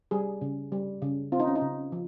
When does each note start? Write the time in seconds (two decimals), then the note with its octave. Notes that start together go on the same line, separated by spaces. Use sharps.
0.11 G3 G#4
0.41 C#3
0.72 G3
1.02 C#3
1.32 C4 F4
1.40 D#4
1.47 C#4
1.56 D#4
1.61 C#3
1.92 F3